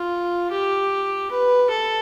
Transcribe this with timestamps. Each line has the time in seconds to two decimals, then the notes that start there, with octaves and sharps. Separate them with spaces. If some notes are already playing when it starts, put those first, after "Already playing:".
Already playing: F4
0.51 G4
1.31 B4
1.70 A4